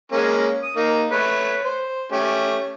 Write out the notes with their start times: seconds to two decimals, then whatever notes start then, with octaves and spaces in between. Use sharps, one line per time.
0.12 G#3 A#3 C#4
0.63 D#6
0.76 A#3 D#4
1.11 A3 B4 C#5
1.64 C5
2.12 A3 C#4 G4